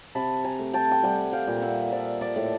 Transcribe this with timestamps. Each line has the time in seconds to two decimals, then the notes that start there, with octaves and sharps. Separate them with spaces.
0.15 C3 A5 B5
0.44 G#5 A#5
0.59 A3
0.73 G5 A5
0.91 G5
1.03 G3 F#5 G#5
1.33 F5 G5
1.47 A#2
1.62 E5 F#5
1.92 F3 D5 E5
2.21 D5 E5
2.36 A2